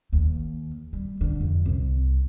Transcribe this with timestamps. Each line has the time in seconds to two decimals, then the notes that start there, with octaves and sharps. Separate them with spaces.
0.13 D#2
0.93 G3
1.21 D3
1.40 F2
1.65 C2